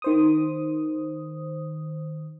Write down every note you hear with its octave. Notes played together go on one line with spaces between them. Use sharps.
D#3 C5 D#6